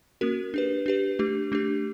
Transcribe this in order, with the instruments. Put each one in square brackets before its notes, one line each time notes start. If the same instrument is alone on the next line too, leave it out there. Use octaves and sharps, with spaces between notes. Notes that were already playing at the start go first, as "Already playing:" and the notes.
[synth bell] A#3 C#4 F#4 A#4
D4 G4 B4
D4 G4 B4
A3 D4 G4
A3 D4 G4